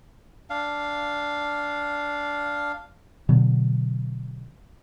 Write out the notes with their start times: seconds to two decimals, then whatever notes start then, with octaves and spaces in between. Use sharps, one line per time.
0.50 D4 F5
3.29 B2 D3 F#3